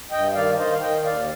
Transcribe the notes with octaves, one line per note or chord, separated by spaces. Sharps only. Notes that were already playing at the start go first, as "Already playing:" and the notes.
G2 D#5 G5
D#3 D5 F5
D#3 C5 D#5
F5
D#3 D#5 G5
D#2 D5 F5